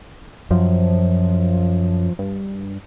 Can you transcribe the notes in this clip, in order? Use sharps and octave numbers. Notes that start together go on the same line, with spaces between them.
F#2 F3
G2